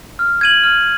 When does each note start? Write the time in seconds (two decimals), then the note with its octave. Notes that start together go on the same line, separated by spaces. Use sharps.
0.19 F6
0.41 G#6 D#7 F#7
0.64 F6